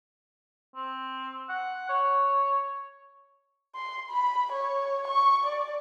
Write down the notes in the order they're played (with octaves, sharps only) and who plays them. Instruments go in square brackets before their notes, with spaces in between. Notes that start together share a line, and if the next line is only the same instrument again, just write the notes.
[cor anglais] C4
F#5
C#5
[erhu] C6
B5
C#5
C#6
D5